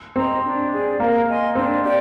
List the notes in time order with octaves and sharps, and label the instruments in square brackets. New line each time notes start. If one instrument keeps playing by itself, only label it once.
[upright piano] C4 [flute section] D#5 A#5
[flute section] D4
G#4 D5
[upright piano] A#3 [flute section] A#4
[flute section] D#5 G#5 C6
[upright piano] C4 [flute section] D4
[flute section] G4 D5 G5